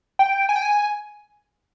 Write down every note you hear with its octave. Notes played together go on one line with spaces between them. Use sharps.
G5
G#5
G5
G#5